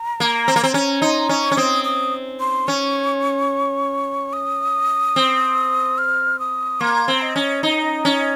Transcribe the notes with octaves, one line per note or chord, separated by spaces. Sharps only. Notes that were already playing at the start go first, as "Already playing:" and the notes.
Already playing: A#5
A#3
C4
A#3
C4
C#4
D#4 C6
C#4 C#6
C#4
C4 D#6
D#6
C6
C#4 C#6
D#6
C4
F6
D#6
A#3 C6
C4
D#5
C#4
D#4
C#4